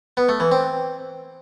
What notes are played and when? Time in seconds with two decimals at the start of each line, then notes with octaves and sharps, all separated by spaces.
0.17 B3
0.29 A3
0.40 E3
0.52 C4